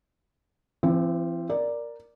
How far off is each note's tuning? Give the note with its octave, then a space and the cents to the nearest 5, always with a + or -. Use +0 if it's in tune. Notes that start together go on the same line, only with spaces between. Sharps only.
E3 +45 C4 +0
A#4 +0 D5 +0